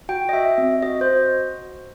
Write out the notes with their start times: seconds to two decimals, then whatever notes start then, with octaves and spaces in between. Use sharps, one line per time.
0.09 F#4 G5
0.29 D#5
0.33 F#4 E5
0.58 C4
0.82 F#4 D#5
1.01 C5
1.07 F#4